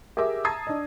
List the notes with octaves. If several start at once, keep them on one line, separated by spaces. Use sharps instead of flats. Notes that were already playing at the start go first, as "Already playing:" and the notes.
G4 G#4 A#4 E5 D6
A5 A#5 D#6 E6 G#6 C7
D4 D#5